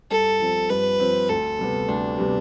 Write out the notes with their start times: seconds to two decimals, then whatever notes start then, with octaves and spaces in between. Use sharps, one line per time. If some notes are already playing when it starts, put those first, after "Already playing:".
0.11 G2 A4
0.40 F3 C4
0.70 G2 B4
1.00 F3 C4
1.29 D2 A4
1.59 C3 G3 B3
1.88 D2 D4
2.18 C3 G3 B3